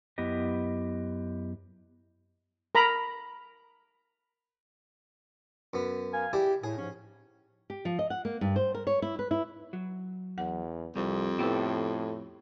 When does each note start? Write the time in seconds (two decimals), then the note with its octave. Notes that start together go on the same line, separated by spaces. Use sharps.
0.18 F#2 B3 E4 G4 D#5
2.75 A#4 A#5 B5
5.74 F#2 B3
6.12 A#4 F5 G#5
6.33 E4 G4 G#4 D5
6.64 A2 G#4
6.78 G#2 F3 C#4
7.70 G4
7.85 F3
7.99 D#5
8.10 F#5
8.25 A#3
8.41 G2
8.56 C5
8.74 A#4
8.87 C#5
9.02 E4
9.19 B4
9.31 E4
9.73 F#3
10.38 E2 F#5
10.96 C2 F2 G3
11.39 A2 B3 E4 F#4 G4 A4 B4